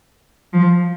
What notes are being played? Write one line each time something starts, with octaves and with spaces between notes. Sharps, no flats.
F3